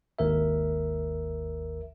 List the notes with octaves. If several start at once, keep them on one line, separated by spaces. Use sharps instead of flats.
G#1 D#2 A#4 E5